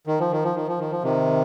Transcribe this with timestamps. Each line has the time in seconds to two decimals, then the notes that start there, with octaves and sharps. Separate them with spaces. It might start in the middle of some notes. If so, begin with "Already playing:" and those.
0.07 D#3
0.20 F3
0.32 D#3
0.43 F3
0.55 D#3
0.68 F3
0.79 D#3
0.91 F3
1.03 C3 D#3